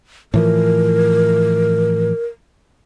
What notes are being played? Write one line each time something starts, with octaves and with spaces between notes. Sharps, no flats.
A2 E3 F3 A#4